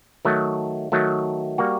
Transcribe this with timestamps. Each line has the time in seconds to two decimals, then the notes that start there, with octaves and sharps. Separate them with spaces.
0.25 D#3 F#3 A3
0.92 D#3 F#3 A3
1.58 G3 A#3 F#4